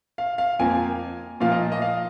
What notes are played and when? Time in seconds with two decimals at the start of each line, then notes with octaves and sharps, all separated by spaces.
0.18 F5
0.38 F5
0.59 F2 F3 A#3 G#5
1.40 A#2 F3 A#3 F4 F5
1.52 D#5
1.72 D#5
1.82 F5